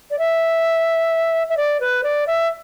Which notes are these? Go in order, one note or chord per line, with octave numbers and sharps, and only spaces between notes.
D5
E5
E5
D5
B4
D5
E5